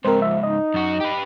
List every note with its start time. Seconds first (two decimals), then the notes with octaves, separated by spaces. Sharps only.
0.05 C#2 G#2 C4 A#4 C5
0.22 F3 E5
0.43 D#4 D#5
0.74 F#2 F#4
1.01 G4 B4